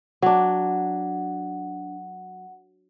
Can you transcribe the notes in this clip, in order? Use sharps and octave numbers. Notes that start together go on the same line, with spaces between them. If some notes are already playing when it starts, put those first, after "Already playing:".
F#3 D4 F#5